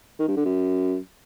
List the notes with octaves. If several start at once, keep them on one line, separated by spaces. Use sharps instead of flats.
D#3
G2
D3
F#2